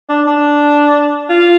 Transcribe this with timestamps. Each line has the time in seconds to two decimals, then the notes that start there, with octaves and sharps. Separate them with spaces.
0.09 D4
0.27 D4
1.30 F4